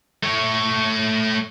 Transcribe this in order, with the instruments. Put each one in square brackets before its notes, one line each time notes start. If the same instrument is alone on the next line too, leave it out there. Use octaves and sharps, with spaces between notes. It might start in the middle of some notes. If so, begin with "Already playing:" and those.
[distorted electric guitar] A3 C#5